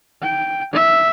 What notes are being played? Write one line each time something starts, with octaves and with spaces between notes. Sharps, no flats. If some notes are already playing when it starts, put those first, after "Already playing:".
G5
E5